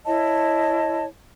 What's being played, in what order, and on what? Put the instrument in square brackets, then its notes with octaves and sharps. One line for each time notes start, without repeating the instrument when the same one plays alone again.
[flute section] E4 C#5 D#5 A5